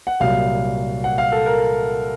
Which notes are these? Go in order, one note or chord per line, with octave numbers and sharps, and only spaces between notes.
F#5
C2 A#2 F#3 F5
F#5
F5
A4
A#4